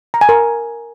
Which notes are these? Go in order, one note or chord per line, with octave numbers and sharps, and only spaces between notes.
A#5
G#5
A#4